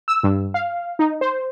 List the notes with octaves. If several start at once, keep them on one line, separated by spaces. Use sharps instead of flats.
E6
G2
F5
D#4
C5